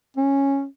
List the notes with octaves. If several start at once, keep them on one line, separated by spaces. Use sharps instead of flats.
C#4